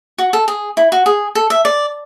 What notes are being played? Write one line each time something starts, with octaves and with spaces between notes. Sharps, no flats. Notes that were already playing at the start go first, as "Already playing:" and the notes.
F#4
A4
G#4
E4
F#4
G#4
A4
E5
D5